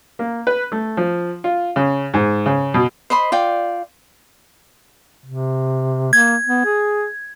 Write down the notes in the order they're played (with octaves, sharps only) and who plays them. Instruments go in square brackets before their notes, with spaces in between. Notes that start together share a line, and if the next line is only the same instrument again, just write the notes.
[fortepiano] A#3
B4
A3
F3
F4
C#3
G#2
C#3
B2
[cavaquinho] C5 D#5 B5 C6
F4 D5 G5
[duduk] C3
[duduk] A#3 [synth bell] G#6
[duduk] B3
G#4